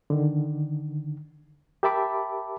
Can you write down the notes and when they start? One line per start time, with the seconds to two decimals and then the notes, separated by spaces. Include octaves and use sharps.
0.10 D3 D#3
1.83 G4 A#4 E5 A5 B5 D6